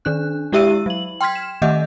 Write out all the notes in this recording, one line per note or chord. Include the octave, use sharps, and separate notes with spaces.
D#3 D4 F#6
G#3 E4 G4 E5 E6 D#7
F#3 F#7
G5 C6 F6 G#6 B6
E7
D#3 A3 D#5 E5 F#5 G6